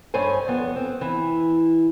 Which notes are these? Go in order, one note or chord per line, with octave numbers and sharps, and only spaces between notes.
G2 C#4 C5 G#5
F2 B3
C4
E3